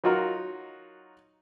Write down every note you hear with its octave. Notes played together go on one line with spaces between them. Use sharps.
F#3 D#4 F4 F#4 A#4